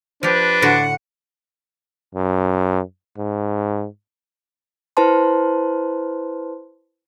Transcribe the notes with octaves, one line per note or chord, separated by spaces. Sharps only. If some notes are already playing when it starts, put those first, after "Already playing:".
F3 D4 G4 B4
A2 D3 F#4 F#5
F#2
G#2
E4 B4 C5 A5 C6